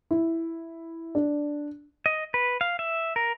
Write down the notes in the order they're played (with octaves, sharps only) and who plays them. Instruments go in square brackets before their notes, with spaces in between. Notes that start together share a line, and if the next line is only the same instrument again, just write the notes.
[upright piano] E4
D4
[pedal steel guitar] D#5
B4
F5
E5
A#4